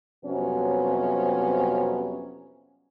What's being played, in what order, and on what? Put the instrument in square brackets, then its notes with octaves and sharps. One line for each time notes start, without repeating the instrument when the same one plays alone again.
[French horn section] F2 C3 F#3 G3 B3 C#4